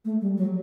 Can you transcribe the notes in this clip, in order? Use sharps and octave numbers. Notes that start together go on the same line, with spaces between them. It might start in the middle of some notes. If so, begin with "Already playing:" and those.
A3
G3
F#3